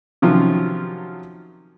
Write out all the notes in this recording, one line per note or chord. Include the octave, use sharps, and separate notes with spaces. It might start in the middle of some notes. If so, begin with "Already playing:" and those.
C3 D#3 F3 F#3 C#4 F4